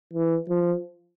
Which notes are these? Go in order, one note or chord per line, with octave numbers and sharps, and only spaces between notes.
E3
F3